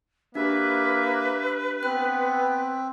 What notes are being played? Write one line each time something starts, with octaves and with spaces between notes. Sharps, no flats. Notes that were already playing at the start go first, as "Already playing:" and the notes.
A#3 D4 G4 B4 E5
B3 C4 F#6